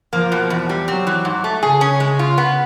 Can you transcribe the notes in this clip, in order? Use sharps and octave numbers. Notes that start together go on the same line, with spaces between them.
F3 A#3
B2
E2
G3
F#3 C4
E3
G#2
A3
C#3 G#4
C#4
G#3
F4
B3